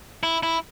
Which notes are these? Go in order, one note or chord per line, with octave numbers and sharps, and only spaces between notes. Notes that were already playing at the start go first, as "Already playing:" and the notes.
E4
E4